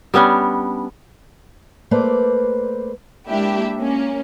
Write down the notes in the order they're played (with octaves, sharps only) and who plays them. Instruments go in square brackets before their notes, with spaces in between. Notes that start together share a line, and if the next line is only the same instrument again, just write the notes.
[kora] G3 B3 C#4 D4
[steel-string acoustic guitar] A3 A#3 B4 C5 D5
[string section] G#3 A#3 D4 E4 G4 E5
A#3 C#4